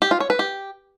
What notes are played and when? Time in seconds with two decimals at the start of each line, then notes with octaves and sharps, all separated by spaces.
0.02 G4
0.11 F4
0.20 C#5
0.30 B4
0.39 G4